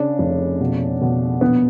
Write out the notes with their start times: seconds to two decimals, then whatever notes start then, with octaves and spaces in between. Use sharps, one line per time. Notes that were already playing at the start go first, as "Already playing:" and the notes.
Already playing: C#3 D4
0.19 F1
0.60 B2
1.01 B2
1.41 A#1 B3